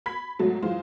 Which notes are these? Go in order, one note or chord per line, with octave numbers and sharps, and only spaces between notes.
B5 G#6 B6
G#2 B2 F#3 A3
F#2 E3 G#3 F4 C5